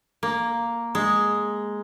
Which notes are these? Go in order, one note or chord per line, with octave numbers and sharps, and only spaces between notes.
A#3
G#3